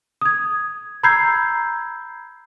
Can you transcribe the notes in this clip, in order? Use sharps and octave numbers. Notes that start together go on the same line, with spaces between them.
D#6 G#6
A#5 B5 E6 G6 G#6 C7